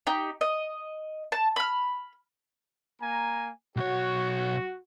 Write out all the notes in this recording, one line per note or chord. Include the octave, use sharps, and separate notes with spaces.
D#4 G4
D#5
A5
B5 F6
A#3 G#5 A#5
B1 F#4 C#5